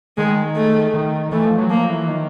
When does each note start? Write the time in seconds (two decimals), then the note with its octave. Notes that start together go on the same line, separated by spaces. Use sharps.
0.17 D#3 G#3
0.56 A3
0.94 D#3
1.32 E3 A3
1.45 F3
1.58 F#3
1.70 F3 A#3
1.89 E3
2.08 D#3